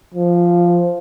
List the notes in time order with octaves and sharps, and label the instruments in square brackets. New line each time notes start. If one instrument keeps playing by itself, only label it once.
[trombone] F3